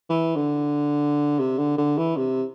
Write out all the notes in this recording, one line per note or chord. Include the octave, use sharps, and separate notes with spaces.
E3
D3
C3
D3
D3
E3
C3